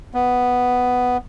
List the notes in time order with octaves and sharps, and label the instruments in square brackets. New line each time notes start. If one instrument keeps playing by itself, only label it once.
[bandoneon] B3